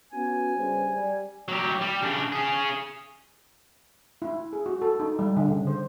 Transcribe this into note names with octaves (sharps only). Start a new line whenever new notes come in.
B3 C#4 F#4 G#5
G2 C#3 C5
G3
F#3 G4
G3
C#3 D4
C#4 G#4
E4
G#4
F#4
A4
D#4
G3
D3
C#3
C5